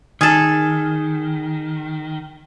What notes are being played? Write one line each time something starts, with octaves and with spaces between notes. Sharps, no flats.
D#3 G#4 A4